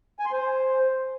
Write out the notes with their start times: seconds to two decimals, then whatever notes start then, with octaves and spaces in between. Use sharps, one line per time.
0.19 G#5
0.26 C6
0.32 C5